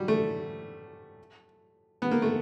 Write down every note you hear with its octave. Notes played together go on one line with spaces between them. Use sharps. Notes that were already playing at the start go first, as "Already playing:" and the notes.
Already playing: F#3 G3
A3
B3
A#3
A3